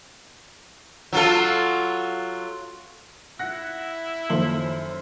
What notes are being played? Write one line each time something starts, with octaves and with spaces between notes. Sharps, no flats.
F#3 F4 A4
E4 F#5 F#6 A#6
F#2 D#3 F3 A#3 A4 C5 F#7